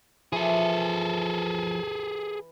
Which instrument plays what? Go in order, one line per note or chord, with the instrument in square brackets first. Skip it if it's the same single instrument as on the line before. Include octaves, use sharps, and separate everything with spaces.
[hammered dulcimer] E3 [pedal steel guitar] F3 [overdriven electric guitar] G#4 A4